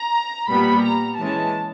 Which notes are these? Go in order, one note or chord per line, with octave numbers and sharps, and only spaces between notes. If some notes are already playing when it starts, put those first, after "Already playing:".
Already playing: A#5
A#2 G3 B3 B5
A#5
E3 G#3 C#4 A5